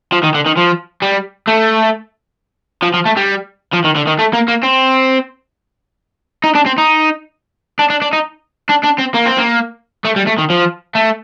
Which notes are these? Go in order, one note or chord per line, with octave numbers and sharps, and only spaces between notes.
F3
D#3
D3
D#3
F3
G3
A3
F3
F3
A3
G3
F3
D#3
D3
D#3
A3
A#3
A#3
C4
D#4
D4
C4
D#4
D4
D4
D4
D#4
D4
D4
C4
A#3
C4
A#3
A3
G3
A3
D#3
F3
A3